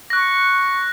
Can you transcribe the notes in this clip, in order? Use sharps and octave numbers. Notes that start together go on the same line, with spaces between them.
C#6 F#6 A#6